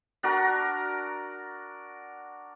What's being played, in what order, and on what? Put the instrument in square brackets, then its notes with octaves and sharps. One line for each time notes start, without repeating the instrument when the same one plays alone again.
[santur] D4 F#4 A#4